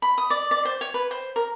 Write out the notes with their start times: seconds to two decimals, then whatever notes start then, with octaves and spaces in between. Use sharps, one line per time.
0.02 B5
0.18 D#6
0.30 D5
0.51 D5
0.65 C5
0.81 C#5
0.94 B4
1.11 C5
1.36 A#4